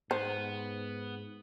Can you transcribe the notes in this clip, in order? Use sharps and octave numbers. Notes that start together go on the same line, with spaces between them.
G#2 B3 C5